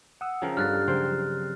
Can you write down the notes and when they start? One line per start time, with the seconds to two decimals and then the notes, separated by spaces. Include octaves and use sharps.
0.21 F#5 D#6 E6
0.42 C#3 F3 A#4 G5
0.57 G2 A4 F5 F6 F#6 A6
0.88 C#3 F3 F#3 C4 A#4 C5